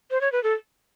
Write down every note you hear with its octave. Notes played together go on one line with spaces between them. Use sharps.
C5
C#5
B4
A4